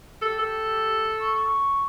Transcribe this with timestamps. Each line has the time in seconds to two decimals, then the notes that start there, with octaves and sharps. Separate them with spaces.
0.22 G4 A4
0.39 A4
1.20 C#6